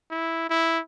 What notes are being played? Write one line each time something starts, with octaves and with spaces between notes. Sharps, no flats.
E4
E4